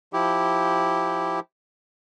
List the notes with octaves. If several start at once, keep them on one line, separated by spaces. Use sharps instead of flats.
F3 E4 G4